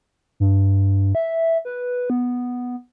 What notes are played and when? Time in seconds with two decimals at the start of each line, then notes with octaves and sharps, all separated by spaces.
0.40 G2
1.15 E5
1.65 B4
2.10 B3